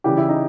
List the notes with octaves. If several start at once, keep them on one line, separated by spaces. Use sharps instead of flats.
C#3 E3 G3 G4
E4
D#4